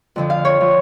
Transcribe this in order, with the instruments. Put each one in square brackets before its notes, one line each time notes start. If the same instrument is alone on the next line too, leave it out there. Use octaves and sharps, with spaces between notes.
[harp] F2 D3 F3
F5
C#5
D3 F3